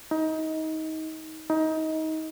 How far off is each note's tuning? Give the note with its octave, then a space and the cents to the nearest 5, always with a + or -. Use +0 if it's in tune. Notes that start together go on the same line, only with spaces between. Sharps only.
D#4 +25
D#4 +25